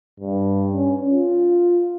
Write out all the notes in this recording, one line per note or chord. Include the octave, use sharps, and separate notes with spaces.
G2
C#4
F4